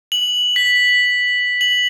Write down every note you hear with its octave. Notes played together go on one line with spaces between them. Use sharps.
F#7
B6
F#7